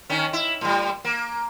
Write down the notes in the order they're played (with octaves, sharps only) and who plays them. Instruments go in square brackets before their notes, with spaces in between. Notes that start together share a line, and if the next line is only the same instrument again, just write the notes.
[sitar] D#3 C#4
E4
A2 G3
A#3